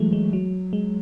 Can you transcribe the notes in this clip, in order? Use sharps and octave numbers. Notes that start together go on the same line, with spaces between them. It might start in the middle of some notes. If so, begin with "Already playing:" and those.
Already playing: E3 F#3 G#3 A3
G#3
F#3
G#3